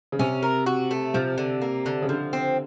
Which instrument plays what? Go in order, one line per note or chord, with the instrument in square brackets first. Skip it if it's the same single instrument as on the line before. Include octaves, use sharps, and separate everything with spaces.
[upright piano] C#3
[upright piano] C3 [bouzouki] C#4
[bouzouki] A#4
F#4
A3
[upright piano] C3 [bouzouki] F3
[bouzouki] D3
A#3
D3
[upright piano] C#3
[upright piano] D3 [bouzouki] F3
[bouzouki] C4